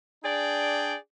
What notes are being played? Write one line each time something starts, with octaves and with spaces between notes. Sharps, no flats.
D4 G#4 D5 G5